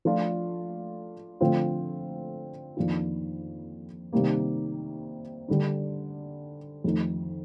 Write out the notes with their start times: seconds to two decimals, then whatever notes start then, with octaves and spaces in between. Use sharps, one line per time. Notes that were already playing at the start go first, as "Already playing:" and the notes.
0.05 F3 A3 D4 F4
1.41 D3 F3 A3 C4 F4
2.77 F2 D#3 A#3 D4 F4
4.13 C3 D#3 G3 A#3
5.48 D3 G3 D4
6.84 F2 D#3 A3 D#4